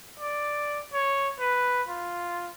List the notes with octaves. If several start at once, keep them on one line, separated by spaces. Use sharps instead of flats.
D5
C#5
B4
F4